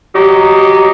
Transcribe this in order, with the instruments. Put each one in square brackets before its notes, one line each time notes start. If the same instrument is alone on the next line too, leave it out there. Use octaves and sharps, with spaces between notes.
[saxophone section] F#3 D#4 G4